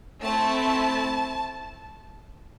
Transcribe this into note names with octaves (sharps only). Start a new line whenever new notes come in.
A3 C4 E4 A5